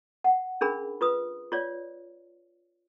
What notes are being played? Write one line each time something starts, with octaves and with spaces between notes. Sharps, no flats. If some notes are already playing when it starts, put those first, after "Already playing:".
F#5
C#4 D4 G#4 A#4 B5
F4 B4 D#6
F4 C#5 D5